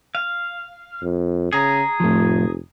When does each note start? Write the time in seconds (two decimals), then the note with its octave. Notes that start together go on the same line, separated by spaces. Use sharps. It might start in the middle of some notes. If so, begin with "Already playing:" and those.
0.15 F5
1.02 F2
1.53 C#3 G#4 A#5
2.00 F1 A2 F3